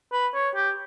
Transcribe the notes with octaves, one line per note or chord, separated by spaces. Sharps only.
B4
C#5
G4